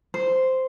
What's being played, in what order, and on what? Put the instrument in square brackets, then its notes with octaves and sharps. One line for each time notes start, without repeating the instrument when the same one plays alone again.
[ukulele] C5